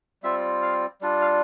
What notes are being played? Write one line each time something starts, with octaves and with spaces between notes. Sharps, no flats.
G3 C4 F4 E5
F5
G3 D4 F4
F5